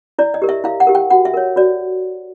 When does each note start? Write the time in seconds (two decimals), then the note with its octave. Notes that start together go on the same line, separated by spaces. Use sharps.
0.19 E4 D5
0.34 D#5
0.42 G4 A#4
0.49 E5
0.64 E4 F5
0.80 F#5
0.87 G4 A#4
0.95 G5
1.10 F#4 F#5
1.25 E5
1.34 A#4 C#5
1.56 F#4 D5